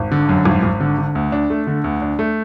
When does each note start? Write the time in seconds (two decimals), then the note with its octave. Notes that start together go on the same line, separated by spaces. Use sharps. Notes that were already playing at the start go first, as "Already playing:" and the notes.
Already playing: G#1
0.12 D3
0.29 F#2
0.45 G#1
0.63 G#1
0.80 D3
0.98 D3
1.15 D2
1.32 D4
1.50 A3
1.67 D3
1.84 D2
2.02 D4
2.19 A3